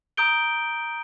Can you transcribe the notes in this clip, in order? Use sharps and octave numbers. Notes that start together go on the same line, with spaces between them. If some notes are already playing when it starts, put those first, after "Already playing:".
A#5 D#6 G6 D7 G7